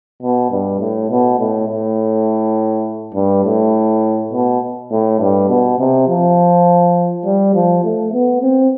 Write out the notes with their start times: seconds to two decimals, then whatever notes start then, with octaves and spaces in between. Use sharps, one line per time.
0.22 B2
0.51 G2
0.80 A2
1.10 B2
1.39 A2
1.69 A2
3.14 G2
3.45 A2
4.33 B2
4.91 A2
5.19 G2
5.49 B2
5.79 C3
6.08 F3
7.25 G3
7.55 F3
7.84 A3
8.12 B3
8.42 C4